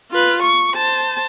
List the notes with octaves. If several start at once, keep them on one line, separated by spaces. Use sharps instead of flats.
F4 B4
C#6
C5 A5